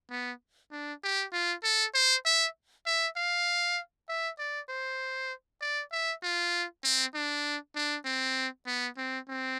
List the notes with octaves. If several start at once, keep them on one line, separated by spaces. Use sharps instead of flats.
B3
D4
G4
F4
A4
C5
E5
E5
F5
E5
D5
C5
D5
E5
F4
C4
D4
D4
C4
B3
C4
C4